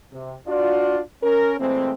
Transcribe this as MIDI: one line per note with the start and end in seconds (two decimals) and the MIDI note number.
0.13 0.34 48
0.48 1.00 62
0.48 1.00 65
0.48 1.00 66
0.48 1.00 74
1.23 1.57 61
1.23 1.57 70
1.60 1.92 46
1.60 1.92 52
1.60 1.92 56
1.60 1.92 57
1.60 1.92 60